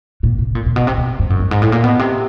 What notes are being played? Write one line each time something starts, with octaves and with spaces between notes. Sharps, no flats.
A#2
C3
A#2
A#2
B2
C3
B2
G2
F#2
G2
G#2
A2
A#2
B2
C3